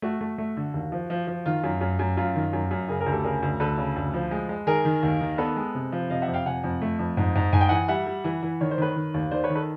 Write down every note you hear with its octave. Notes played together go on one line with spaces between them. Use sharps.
A3 F#4
A3
A3
D3
D#2
F3
F3
F3
D#3 F4
F#2
F#2
F#2
F#2 F4
D#3
F#2
F#2
C#3 G#4 A#4
G#4 A#4
D2
G4 A4
C#3 G#4 A#4
D2
D2 A4 B4
C#3
D2
F3
G#3
G#3
D#3 G#4 A#4
D#3
D#2
D#3
B3 A4 B4
G#3
C3
F3
C3 D#5 F5
E5 F#5
F2
F5 G5
C3 F#5 G#5
F2
A3
F2
G#2
G#2
G#2 G#5
G5
E3 F#5 G#5
G3 E5 F#5
G3
E3
E3
D#3 C#5
C5
D#3 B4 C#5
D#3
D#2
D#3 C5 D5
B4 C#5
D#3
A4 B4